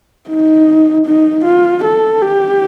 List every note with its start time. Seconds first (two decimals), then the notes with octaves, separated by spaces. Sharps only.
0.28 D#4
1.06 D#4
1.44 F4
1.84 A4
2.22 G4